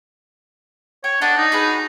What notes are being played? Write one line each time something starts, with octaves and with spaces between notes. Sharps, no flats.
C#5 G5
D4 A4 D#5 F#5
D#4
F#4 G#4 B4